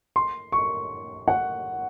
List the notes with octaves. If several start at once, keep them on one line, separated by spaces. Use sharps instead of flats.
C6
C#6
F#5